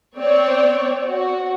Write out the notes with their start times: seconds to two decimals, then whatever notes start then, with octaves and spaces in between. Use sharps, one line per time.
0.19 C4 C#5 D5
1.06 F#4